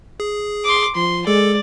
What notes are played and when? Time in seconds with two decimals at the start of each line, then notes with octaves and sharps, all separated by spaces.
0.20 G#4
0.65 C6 D6
0.95 F3 C6
1.27 G#3 A4 D5